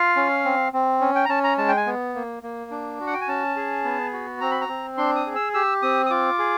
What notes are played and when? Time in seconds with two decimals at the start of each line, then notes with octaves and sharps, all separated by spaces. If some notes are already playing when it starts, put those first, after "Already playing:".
Already playing: F4 F5
0.16 C#4
0.45 C4
0.73 C4
1.01 C#4
1.15 G5
1.25 A#5
1.29 C#4 A5
1.44 A#5
1.58 G#3 A5
1.68 G5
1.77 G#5
1.86 B3
2.15 A#3
2.43 A#3
2.71 D4
3.00 F#4
3.07 F#5
3.14 G5
3.21 G#5
3.28 C#4 A5
3.56 G#4
3.84 B3
4.13 F#4
4.41 C4 A#5
4.51 B5
4.61 A#5
4.69 C4
4.98 D4 C6
5.16 D#6
5.26 G#4
5.35 E6
5.54 G4 E6
5.82 C4 D#6
6.06 D#6
6.10 F4 D6
6.39 G#4